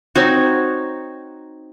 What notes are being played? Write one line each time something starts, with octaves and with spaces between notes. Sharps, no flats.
C4 D#4 F#4 C#5